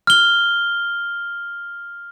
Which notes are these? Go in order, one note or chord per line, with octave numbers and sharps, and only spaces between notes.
F6 G7